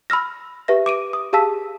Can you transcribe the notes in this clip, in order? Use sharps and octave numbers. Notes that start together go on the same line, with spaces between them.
B5 E6 F6 A#6
G4 B4 E5 A#6
D6 D7 D#7
D#6
G4 G#4 F5 A5 E6 B6